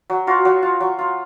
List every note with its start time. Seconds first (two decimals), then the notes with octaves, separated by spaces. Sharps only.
0.10 F#3
0.27 F4 F#4
0.45 F#3
0.63 F4
0.80 F#3
0.99 F4